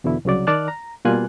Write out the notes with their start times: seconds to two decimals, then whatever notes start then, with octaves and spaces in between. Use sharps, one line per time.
0.04 E2 B2 D3 E4
0.25 C2 C#3 F#3 D5
0.47 D#3 D5 A5 F6 F#6
0.68 A#5
1.05 B2 G3 A#3 F4 G#5 F#6